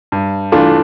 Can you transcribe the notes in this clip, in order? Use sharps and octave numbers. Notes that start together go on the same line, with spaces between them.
G2
E3 A3 D4 F4